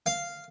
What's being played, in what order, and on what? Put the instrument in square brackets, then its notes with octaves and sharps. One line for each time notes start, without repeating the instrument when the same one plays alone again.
[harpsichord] F5